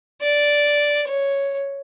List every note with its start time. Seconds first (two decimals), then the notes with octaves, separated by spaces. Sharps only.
0.22 D5
1.08 C#5